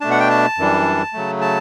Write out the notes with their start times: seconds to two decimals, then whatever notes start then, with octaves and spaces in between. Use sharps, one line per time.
0.01 B2 A3 D4 A5
0.11 F#5
0.20 G5
0.30 A5
0.58 F#2 E3 G3 D4
1.13 C#3 F#3 A3
1.41 A5